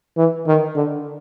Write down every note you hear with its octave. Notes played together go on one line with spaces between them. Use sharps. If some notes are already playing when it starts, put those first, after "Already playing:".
E3
D#3
D3